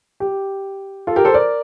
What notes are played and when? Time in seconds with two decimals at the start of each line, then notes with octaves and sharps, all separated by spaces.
0.20 G4
1.07 F4 A4
1.16 G4 A#4
1.25 A4 C5
1.34 A#4 D5